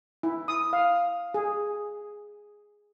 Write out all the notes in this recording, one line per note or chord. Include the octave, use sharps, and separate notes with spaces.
E4
D#6
F5
G#4